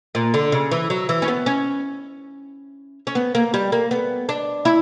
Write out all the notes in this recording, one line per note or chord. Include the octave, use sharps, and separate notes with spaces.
A#2
D3
C#3
E3
F#3
E3
C#4
B3
C#4
C#4
B3
A#3
G3
A#3
B3
D4
E4